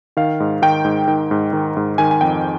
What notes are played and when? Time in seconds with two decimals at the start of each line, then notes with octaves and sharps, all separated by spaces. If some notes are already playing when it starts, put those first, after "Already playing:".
0.17 D#3 F5
0.40 G#2
0.62 D#3 G5
0.85 G#2
1.08 D#3
1.31 G#2
1.53 D#3
1.77 G#2
1.98 D#3 G#5
2.11 G#5
2.21 F2 G5